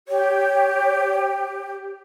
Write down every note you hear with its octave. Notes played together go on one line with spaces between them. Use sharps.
G4 C#5